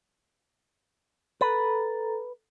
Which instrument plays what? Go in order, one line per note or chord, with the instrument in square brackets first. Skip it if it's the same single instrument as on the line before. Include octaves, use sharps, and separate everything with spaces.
[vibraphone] A4 A#5 [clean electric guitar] B4